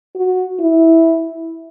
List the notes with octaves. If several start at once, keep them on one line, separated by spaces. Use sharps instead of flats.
F#4
E4